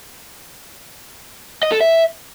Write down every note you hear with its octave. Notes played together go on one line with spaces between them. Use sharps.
D#5
A4
E5